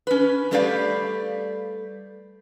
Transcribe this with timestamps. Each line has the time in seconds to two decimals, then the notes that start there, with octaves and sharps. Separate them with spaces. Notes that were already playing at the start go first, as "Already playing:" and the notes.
0.07 C#4 B4
0.51 G3 A3 G4 B4 D5 F5